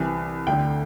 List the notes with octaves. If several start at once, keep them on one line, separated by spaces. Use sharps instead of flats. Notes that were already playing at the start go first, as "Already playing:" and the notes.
Already playing: C2 C3 E3
D2 D3 G5